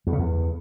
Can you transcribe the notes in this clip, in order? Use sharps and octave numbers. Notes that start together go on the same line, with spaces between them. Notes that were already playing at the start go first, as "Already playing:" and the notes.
E2
C#3
E2